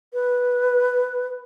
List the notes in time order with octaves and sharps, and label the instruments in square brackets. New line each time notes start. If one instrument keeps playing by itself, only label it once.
[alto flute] B4